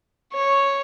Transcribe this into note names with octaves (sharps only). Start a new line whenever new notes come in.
C#5